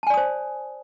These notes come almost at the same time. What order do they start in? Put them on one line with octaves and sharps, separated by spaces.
A5 G#5 D5 D#6 C5